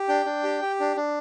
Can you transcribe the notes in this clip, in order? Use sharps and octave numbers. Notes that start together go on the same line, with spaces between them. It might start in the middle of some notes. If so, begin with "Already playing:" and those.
Already playing: G4
D4 G5
D4
G4
G4
D4
D4